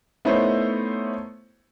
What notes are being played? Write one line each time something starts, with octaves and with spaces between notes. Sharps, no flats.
A3 B3 D#4 E4 C5 C#5